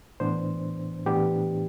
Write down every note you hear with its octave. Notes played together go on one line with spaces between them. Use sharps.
A2 E3 B3 D4 C5
A2 E3 B3 D4 G4